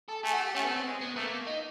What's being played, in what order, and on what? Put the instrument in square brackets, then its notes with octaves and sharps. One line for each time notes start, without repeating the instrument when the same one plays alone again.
[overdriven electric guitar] A4
[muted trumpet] A3 [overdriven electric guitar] G#4
[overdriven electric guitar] F#4
G4
[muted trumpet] A3 [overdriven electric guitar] C#4
[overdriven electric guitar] B3
C4
[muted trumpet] G#3
[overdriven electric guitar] B3
[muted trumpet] A3 [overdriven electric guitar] A#3
[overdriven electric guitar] D#4